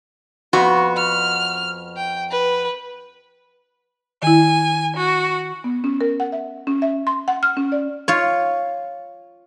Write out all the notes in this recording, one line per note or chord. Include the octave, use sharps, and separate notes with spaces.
F2 B3 F#4
F6
G5
B4
D#3 E4 G#5
F#4
B3
C#4
A#4
F#5
E5
C#4
E5
C6
F#5
F6
C#4
D5
F4 C#5